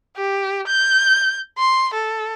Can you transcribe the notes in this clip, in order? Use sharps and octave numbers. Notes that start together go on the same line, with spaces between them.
G4
G6
C6
A4